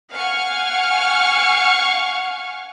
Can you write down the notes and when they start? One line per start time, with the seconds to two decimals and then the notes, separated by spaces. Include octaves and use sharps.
0.13 F5 F#5 G#5 C#6 F6